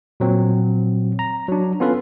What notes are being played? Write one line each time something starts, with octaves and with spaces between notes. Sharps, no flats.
A#2 F#3 C4
A#5
F#3 D4
B3 C#4 F4 A4 B4